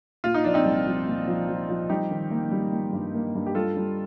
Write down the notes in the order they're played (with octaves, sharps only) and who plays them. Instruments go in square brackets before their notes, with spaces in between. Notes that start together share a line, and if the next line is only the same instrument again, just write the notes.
[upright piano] A#2 [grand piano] F4
[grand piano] D#4
[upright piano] F3 [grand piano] D4
[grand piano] C4 D#4
[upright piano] C2
F3
A#2
F3
F3
F3
[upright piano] G3 [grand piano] D#4 G4
[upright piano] D#3
A#3
G3
A#3
G2
A#3
G2
[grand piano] G4
[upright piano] G3 [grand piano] F4 A4
[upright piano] G3